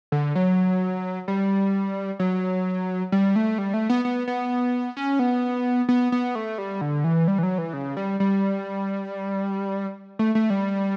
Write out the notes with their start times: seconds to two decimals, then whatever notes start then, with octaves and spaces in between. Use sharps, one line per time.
0.12 D3
0.35 F#3
1.28 G3
2.19 F#3
3.12 G3
3.36 A3
3.58 G3
3.74 A3
3.90 B3
4.05 B3
4.28 B3
4.97 C#4
5.19 B3
5.89 B3
6.12 B3
6.35 A3
6.58 G3
6.81 D3
7.04 E3
7.28 G3
7.38 E3
7.43 F#3
7.58 E3
7.73 C#3
7.97 G3
8.20 G3
10.19 A3
10.35 A3
10.50 G3